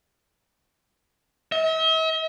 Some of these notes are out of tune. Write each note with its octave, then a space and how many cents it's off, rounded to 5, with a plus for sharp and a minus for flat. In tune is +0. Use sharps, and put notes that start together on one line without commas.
E5 -45